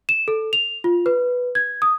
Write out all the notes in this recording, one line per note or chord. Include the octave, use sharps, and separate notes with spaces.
E7
A4
F7
F4
B4
G#6
D#6